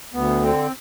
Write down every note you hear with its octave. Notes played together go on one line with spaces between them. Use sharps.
D2 B3
D3 C4